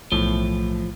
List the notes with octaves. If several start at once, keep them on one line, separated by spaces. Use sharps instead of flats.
B1 A2 E3 F3